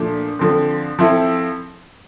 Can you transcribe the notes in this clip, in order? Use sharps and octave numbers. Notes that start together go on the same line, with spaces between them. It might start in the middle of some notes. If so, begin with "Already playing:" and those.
Already playing: A#2 F3 A3 D4
D3 F3 C4
F3 C4 E4 A4